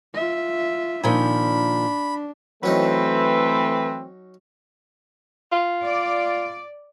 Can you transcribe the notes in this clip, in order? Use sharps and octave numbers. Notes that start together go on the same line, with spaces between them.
F4 E5
A#2 D#3 F3 D4 B5
E3 F#3 A3 C4 C#4 D#4 B4
F4
D5